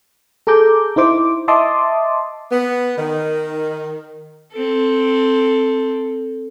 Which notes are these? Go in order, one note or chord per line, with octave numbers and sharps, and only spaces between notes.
G#4 A4 A#5 D6 G6
D#4 E4 C5 D6
D#5 E5 A5 C6 D6 D#6
B3
D#3
C4 A4